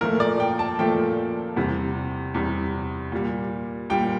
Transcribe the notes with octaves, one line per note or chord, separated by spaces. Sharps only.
A#2 F3 A3 A#4
D5
G5
A5
A#2 F3 A3 G5
E2 C3 G3
E2 C3 G3
A#2 G3
A#2 G3 G5